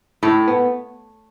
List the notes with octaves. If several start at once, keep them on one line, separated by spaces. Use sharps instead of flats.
A2 A4
B3